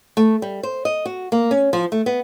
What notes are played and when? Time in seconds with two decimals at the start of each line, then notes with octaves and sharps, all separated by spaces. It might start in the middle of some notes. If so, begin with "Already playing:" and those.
0.17 A3
0.42 G3
0.63 C5
0.85 D#5
1.06 F#4
1.32 A#3
1.51 C#4
1.73 F3
1.92 A3
2.06 B3